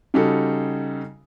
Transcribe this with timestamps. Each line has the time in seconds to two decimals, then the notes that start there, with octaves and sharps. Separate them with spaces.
0.14 C#3 G3 D#4 F#4 A4